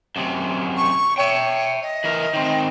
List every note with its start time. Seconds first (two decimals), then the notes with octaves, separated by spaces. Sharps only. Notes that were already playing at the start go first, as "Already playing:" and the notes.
0.16 F#2 C3
0.77 C#6
1.18 C#5 E5 G5
1.82 D#5
2.04 E3 A#4
2.34 D#3 C4